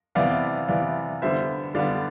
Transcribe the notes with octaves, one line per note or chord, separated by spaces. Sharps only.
C3 E3 B3 D5 F5
C3 E3 B3 D5 F5
D3 G3 B3 C5 E5
D3 G3 B3 D5 F5